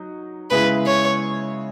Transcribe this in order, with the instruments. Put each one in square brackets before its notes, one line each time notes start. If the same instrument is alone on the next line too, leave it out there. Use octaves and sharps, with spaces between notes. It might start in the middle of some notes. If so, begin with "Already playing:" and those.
Already playing: [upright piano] F#3 D#4
[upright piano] C#3 G#3 B3 E4 G#4 [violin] B4
[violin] C#5